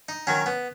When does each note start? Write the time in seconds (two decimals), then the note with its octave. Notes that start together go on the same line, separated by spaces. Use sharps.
0.09 D#4
0.27 D#3 F#3 C#4
0.46 B3